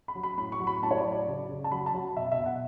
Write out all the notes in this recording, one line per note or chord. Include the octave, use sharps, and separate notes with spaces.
B5
F#3
B5
A2 B5
C#6
F#3
B5
A2 A5
C#5
D5
F#3
D5
C#3
C#3
A5
F#3 B5
A5
F#3
B2 E5
E5
B2
F#5